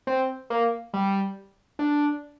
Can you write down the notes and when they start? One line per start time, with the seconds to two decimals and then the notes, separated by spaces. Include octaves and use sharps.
0.07 C4
0.50 A#3
0.94 G3
1.79 D4